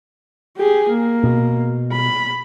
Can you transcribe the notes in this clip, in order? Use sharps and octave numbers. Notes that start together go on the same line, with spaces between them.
G4 G#4
A#3
B2
B5